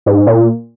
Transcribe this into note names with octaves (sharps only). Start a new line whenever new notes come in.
G#2
A#2